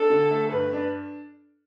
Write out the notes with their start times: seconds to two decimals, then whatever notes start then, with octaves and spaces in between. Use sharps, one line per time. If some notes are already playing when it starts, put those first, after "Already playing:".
Already playing: D4 A4
0.10 D3
0.31 A3
0.52 G2 B4
0.73 D4